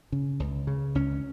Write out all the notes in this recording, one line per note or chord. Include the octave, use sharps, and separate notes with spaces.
C#3
C#2
C#3
C#2 C#4